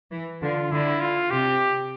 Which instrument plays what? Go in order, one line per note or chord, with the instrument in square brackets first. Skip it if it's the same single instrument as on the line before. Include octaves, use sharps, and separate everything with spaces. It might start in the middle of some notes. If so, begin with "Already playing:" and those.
[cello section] E3
[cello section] D3 [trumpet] F4
[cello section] D3 [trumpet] E4
[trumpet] F4
[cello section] C3 [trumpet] G4